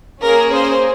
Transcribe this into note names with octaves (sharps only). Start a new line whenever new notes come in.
A#3 C#4 G#4 A#4
C5